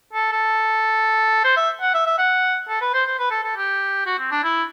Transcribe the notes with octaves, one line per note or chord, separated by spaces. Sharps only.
A4
A4
C5
E5
F#5
E5
E5
F#5
A4
B4
C5
C5
B4
A4
A4
G4
F#4
C4
D4
E4